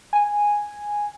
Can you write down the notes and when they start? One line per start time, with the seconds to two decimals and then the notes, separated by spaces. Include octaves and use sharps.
0.13 G#5